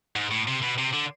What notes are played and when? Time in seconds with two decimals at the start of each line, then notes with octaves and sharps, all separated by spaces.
0.16 G#2
0.31 A2
0.48 C3
0.62 B2
0.79 C3
0.93 D3